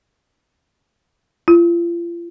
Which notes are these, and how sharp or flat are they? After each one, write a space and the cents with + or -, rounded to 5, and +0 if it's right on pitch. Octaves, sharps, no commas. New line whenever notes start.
F4 -40